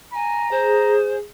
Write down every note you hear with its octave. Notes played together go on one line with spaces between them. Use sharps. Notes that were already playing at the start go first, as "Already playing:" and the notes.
G#5 A#5
G#4 C5